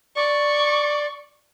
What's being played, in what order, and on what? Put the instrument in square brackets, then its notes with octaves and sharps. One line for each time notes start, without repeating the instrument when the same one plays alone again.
[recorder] D5 [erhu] C#6